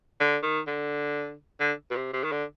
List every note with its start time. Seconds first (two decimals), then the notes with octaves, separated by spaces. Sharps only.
0.20 D3
0.43 D#3
0.67 D3
1.60 D3
1.91 B2
1.96 C3
2.13 C3
2.24 D#3
2.32 D3